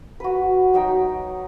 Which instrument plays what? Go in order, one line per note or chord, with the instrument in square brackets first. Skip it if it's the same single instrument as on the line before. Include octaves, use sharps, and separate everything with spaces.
[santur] F#4 B4
F#3 D#4 G5